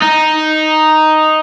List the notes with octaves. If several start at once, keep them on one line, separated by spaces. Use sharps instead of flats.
D#4